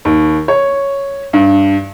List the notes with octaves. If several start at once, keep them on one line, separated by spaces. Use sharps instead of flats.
D#2
C#5
G2